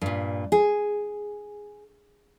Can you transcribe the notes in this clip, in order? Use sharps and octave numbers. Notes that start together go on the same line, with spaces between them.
G2 A#2
G#4